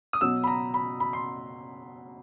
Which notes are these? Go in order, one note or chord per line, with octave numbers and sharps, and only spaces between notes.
D#6
B2 F#3 E6
B5
A#5
B5
B5
C6